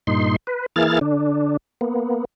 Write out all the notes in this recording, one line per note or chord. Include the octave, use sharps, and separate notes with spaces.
G2 A#2 D#4 C6
B4
E3 A#3 E4 G#4 F6 A6
D3 D4
A#3 B3